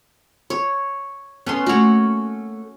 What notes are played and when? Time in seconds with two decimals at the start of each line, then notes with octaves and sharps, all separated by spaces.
0.50 C#5
1.47 B3 C#4 A4 C6
1.66 A3 A#3 F#4 C#5